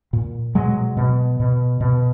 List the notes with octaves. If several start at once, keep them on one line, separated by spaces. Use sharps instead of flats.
A#2
B2 F#3 G#3
B2
B2
B2